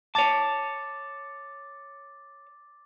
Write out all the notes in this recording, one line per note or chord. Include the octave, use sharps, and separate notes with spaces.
C#5 A5 D6 A6